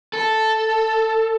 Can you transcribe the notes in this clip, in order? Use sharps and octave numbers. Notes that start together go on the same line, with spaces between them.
A4